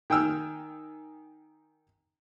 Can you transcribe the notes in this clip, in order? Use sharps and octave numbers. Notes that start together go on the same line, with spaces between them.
D#3 G5 G#5 E6 F6